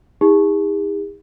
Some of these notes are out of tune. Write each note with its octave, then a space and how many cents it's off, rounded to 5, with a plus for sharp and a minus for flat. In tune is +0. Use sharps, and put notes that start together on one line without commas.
D#4 +45 G#4 -45